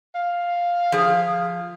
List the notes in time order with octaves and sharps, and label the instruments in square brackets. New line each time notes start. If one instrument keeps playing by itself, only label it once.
[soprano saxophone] F5
[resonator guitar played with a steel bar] F3 G#4